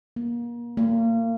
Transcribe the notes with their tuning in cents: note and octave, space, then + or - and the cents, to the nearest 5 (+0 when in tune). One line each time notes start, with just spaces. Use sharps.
A#3 +30
A#3 -30